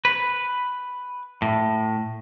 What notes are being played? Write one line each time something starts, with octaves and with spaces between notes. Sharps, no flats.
B4
A2